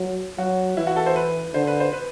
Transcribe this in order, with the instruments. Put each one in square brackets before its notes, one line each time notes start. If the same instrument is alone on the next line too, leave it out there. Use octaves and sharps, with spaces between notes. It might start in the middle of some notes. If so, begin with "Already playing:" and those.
Already playing: [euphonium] F#3
[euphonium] F#3 [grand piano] F#4
[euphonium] E3 [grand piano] E4
[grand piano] F#4
A4
C5
B4
[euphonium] D3 [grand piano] C5
[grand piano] B4
C5
B4